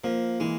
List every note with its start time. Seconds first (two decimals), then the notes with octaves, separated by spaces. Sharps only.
0.04 F3 A#3
0.40 E3 G#3